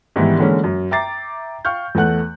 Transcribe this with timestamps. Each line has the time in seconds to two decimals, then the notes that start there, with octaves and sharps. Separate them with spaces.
0.16 G#2 D#3 E3 G3 B3 E4
0.39 D3 E3 G#3 A#3 C#4
0.64 F#2
0.91 E5 G5 A#5 D6 A6 C7
1.65 F5 G5 C#6 F6 G6
1.95 E2 A3 F#5 F#6